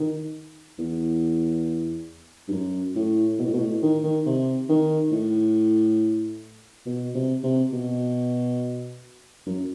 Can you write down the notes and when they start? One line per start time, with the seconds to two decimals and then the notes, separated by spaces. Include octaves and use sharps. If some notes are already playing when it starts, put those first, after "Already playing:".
Already playing: D#3
0.78 E2
2.48 G2
2.52 F#2
2.95 A2
3.39 B2
3.46 A2
3.53 B2
3.60 A2
3.82 D#3
4.04 D#3
4.26 C3
4.69 D#3
5.12 A2
6.86 B2
7.15 C3
7.43 C3
7.73 B2
9.46 F#2